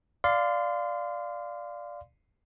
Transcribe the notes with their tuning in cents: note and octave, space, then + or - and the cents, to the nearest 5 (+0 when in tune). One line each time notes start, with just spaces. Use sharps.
D5 +0 F5 +0 C6 -25